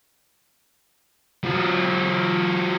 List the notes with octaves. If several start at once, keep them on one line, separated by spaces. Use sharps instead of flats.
F#3 F4